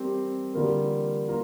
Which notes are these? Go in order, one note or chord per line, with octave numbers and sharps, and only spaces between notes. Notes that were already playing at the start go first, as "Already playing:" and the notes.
Already playing: G3 C4 G4 A#4
D3 G3 A#3 F4 A#4
A#3 F4 A#4